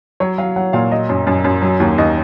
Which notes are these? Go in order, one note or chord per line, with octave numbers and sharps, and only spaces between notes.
F#3 C#5
F#3 F5
F#3 F#5
A#2 F5
F#3 D#5
F#2
F#2
F#2
F#3
D#2
D#2 D#5